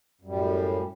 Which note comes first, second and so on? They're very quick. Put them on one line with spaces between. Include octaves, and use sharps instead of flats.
F#2 G3 A2